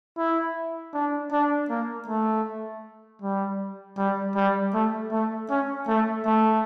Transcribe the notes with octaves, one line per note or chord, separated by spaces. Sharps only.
E4
D4
D4
A#3
A3
G3
G3
G3
A3
A3
C#4
A3
A3